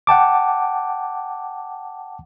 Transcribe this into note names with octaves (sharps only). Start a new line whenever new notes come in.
F#5 G5 A5 D6